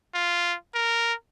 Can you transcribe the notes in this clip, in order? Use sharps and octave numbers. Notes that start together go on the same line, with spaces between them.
F4
A#4